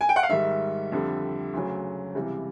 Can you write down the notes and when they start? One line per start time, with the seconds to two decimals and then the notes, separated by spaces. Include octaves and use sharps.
0.01 G#5
0.09 G5
0.16 F#5
0.23 F5
0.29 G#2 D#3 G3 E5
0.92 F2 D3 G3
1.53 D2 C#3 F#3
2.15 C#2 C3 E3 G3